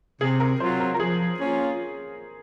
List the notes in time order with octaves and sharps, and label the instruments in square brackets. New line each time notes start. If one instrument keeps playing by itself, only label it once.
[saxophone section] C3 [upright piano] G#4
[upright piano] A#4
[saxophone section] F#3 C4 F4 [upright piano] C5
[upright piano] A#4
A#4
[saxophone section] F3 [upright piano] G#4
[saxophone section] A#3 C#4 F4